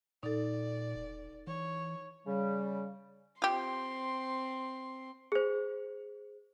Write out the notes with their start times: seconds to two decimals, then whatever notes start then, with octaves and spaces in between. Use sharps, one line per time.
0.23 A#2 D#4 A4 D5
0.95 E1
1.47 E3 C#5
2.27 C#3 G3
3.42 C4 F4 G4 C6
5.32 G#4 C5